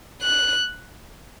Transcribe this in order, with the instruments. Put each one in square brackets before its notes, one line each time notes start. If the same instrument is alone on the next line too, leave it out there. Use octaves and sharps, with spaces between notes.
[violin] F#6